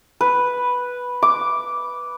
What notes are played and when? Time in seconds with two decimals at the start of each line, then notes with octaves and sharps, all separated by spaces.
0.21 B4
1.22 D6